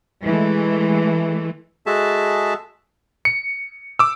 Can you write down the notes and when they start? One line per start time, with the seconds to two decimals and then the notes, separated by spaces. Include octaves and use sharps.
0.23 E3 G#3 A3
1.86 G#3 F#4 G#4 A4 E5 A5
3.25 C#7
3.99 D6 E6